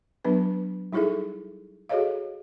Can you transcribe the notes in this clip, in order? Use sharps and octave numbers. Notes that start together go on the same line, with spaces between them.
F#3 B3 D4 B4
G3 D#4 E4 G#4 A4 E5
F#4 G#4 A4 C#5 D#5 F5